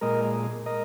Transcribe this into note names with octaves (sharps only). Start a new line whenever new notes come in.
A#2 G#3 A#4 D#5
A#4 D#5